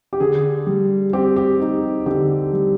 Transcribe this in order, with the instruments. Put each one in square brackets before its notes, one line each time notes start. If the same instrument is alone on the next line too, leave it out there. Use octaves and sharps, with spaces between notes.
[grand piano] G4
D3 G#4
G3
C4 G4
G4
D#4
D3 G4
G3